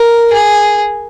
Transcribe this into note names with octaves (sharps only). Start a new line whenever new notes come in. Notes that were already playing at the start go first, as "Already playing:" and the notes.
Already playing: A#4
G#4